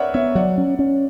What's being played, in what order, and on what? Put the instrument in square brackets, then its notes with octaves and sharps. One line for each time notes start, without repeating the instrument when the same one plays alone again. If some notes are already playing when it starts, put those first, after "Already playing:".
Already playing: [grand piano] A#4 B4 C#5 D5 E5 F#5
[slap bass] B3 [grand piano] C#5 E5
[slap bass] F#3 [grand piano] D5 F#5
[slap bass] C#4
C#4